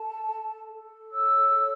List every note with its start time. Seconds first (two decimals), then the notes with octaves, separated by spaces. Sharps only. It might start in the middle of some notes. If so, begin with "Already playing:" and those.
Already playing: A4 A5
0.31 A4
0.71 A4
1.11 C#5 E6
1.53 A4